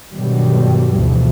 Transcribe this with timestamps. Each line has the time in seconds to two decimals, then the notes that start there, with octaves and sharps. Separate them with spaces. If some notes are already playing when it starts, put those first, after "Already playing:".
0.12 G2 B2 D3 D#3 F#3 G3
0.92 D2 G2 B2 E3 F3